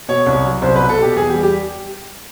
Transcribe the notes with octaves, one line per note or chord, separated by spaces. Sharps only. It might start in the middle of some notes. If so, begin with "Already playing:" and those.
B2 C#5
C2
F#3
C2 C5
B4
B2
A4
B2 G4
E2 G#4
G4
G3
G4